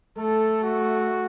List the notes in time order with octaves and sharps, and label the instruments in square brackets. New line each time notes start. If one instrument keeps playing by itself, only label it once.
[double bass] A3 [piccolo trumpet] A4
[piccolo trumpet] F#4